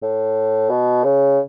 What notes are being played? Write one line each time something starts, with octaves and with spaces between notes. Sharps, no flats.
A2
B2
C#3